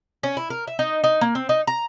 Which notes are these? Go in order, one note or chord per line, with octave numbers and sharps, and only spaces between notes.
C#4
E4
A#4
E5
D#4
D#4
A#3
C4
D#4
A#5